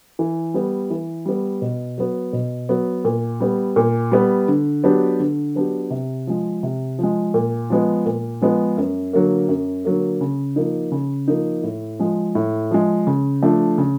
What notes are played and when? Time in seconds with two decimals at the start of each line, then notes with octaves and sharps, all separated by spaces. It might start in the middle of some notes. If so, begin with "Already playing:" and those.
0.19 E3
0.54 G3 B3
0.90 E3
1.26 G3 B3
1.62 B2
1.98 F#3 B3
2.33 B2
2.69 F#3 B3
3.05 A#2
3.40 G3 B3
3.76 A#2
4.12 G3 B3
4.48 D3
4.83 F#3 B3 D4 G4
5.20 D3
5.55 F#3 B3 D4 G4
5.91 C3
6.27 F3 G#3
6.63 C3
6.99 F3 G#3
7.34 A#2
7.70 F3 G#3 B3
8.06 A#2
8.41 F3 G#3 B3
8.77 F#2
9.13 D3 F#3 A#3
9.48 F#2
9.85 D3 F#3 A#3
10.21 C#3
10.56 F3 A#3 D#4
10.92 C#3
11.28 F3 A#3 D#4
11.63 A2
11.99 F3 G#3
12.35 A2
12.71 F3 G#3
13.07 C#3
13.42 F3 A3 D4
13.78 C#3